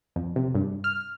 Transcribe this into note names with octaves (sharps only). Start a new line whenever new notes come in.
F2
C3
G2
F6